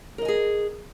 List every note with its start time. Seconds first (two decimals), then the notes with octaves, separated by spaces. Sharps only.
0.18 A#4
0.22 D#5
0.25 G#5
0.28 G#4